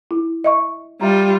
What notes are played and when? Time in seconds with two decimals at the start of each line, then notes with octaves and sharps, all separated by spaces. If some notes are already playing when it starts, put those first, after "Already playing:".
0.11 E4
0.44 D#5 E5 C#6
1.01 G3 F4 E5 A#5